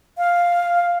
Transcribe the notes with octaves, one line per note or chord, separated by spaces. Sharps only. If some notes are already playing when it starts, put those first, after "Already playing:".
F5